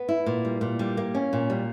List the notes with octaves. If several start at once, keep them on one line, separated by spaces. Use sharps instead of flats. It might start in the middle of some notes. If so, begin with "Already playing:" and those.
Already playing: B3
E4
A#2
G3
A#2
G3
A#3
C#4
A#2
G3